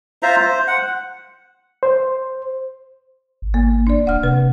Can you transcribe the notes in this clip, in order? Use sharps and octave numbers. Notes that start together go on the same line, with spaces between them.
F4 C5 E5 A#5
C5
F#5
C5
G#1
A#3
D4 D5
D#1 F#5 F6
C3 B4